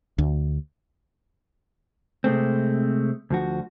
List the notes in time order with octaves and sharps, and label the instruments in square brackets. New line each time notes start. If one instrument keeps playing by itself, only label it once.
[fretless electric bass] D2
[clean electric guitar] C3 G#3 A3 C4
D2 F3 F#4